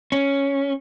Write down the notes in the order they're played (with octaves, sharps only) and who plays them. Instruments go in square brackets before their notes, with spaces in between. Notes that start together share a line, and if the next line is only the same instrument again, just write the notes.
[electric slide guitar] C#4